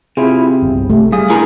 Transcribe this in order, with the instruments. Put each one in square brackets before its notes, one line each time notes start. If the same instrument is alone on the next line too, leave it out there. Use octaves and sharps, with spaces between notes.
[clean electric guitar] C3 [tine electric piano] E4 F4 [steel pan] G#4
[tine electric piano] G1 C2
[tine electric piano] C3 [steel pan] A3
[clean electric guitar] G3 [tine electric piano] G#4 F5 D#6
[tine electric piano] D4 G#4 [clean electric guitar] E4 A#4 A#5